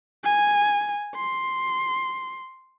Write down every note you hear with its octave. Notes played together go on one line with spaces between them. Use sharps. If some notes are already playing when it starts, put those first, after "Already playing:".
G#5
C6